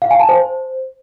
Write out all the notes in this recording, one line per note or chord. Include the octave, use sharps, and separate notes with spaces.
F5
G#5
A5
C5